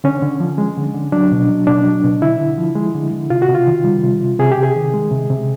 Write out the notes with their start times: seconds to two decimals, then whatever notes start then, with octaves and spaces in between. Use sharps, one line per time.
0.04 D3 C#4
0.22 D3
0.40 F3
0.58 G#3
0.77 D3
0.94 D3
1.12 F#3 D4
1.32 B2
1.49 F#3
1.67 B2 D4
1.85 F#3
2.04 B2
2.22 D3 E4
2.39 D3
2.58 F3
2.76 G#3
2.95 D3
3.13 D3
3.30 C3 F4
3.42 F#4
3.49 C3
3.55 F4
3.67 D#3
3.84 G3
4.03 C3
4.21 C3
4.39 C3 G#4
4.52 G4
4.57 C3
4.63 G#4
4.76 D#3
4.94 G#3
5.11 C3
5.30 C3